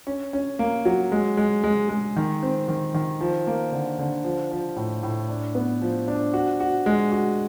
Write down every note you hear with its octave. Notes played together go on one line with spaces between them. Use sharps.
C#4
C#4
A#3
F#3
G#3
G#3
G#3
G#3
D#3
C4
D#3
D#3
F3
A#3
D3
D3
F3
F3
A2
A2
D4
B3
F3
D4
F#4
F#4
G#3
F#4